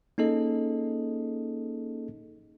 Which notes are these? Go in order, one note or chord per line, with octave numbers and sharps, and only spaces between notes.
A#3 C#4 D#4 G#4 A4 D#5